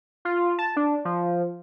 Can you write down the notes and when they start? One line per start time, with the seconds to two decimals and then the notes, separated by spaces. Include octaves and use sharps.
0.25 F4
0.58 A5
0.76 D4
1.05 F3